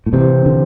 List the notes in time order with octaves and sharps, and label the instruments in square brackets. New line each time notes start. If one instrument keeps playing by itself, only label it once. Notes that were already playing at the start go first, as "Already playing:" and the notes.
[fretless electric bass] A2
[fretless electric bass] C3 [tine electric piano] E3 C4 G4 C5
[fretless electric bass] D3